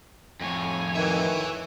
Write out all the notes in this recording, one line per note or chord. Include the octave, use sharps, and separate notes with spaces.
F2 A2 C#5 G#5
D#3 B4 E5